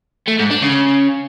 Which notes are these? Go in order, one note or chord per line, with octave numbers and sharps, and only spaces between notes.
A3
G#2
D4
C#3